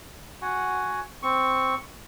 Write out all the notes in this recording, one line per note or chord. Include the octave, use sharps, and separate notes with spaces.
F#4 F#5 G#5
C4 C#6